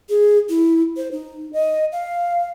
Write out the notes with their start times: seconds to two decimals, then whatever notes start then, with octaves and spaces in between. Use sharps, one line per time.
0.09 G#4
0.49 E4
0.97 C5
1.12 D#4
1.53 D#5
1.92 F5